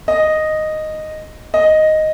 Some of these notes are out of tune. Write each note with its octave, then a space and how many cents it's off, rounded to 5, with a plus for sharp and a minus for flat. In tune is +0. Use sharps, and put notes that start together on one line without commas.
D#5 -5
D#5 +0